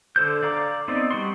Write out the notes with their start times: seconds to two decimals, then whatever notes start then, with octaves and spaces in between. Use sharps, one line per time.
0.16 D3 A4 C5 G6
0.43 D5 F5 A#5 D6
0.88 B3 C4 D#4 D5
1.11 G3 F#4 C6